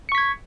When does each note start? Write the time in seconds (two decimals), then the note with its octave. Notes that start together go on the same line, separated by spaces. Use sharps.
0.09 C#7
0.12 C#6
0.15 B6
0.18 G#6